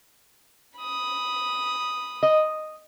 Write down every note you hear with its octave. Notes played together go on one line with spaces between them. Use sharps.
B5 D#6
D#5